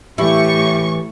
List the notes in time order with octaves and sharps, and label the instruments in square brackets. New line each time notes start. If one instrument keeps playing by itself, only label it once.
[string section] A2 C#6 [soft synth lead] E3 [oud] E4 [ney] G4